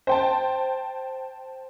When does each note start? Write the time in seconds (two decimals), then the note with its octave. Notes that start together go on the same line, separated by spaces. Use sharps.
0.07 C5 G5 A5